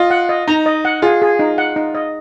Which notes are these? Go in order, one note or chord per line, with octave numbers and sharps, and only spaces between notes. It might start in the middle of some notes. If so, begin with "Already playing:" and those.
Already playing: F4 D#5
F#5
D#5
D#4 A#5
D#5
F#5
F4 G#4
G#4
D#4
F#5
D#4
D#5